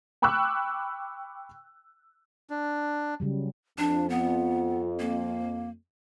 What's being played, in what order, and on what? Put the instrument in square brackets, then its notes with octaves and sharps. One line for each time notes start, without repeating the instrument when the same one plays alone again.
[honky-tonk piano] G5 B5 C#6 D6 E6 F#6
[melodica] D4
[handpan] C#3 F#3 G3
[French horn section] F2 [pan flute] D4
[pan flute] B3
A#3